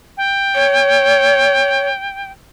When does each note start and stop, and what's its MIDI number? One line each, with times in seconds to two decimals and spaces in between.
0.17 2.31 79
0.55 1.89 73